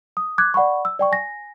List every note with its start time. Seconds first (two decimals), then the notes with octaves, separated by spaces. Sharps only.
0.17 D#6
0.38 D6 F#6 G#6
0.54 D5 F#5 B5 C#6
0.85 E6
0.99 D5 G5 C#6
1.12 G#5 A#6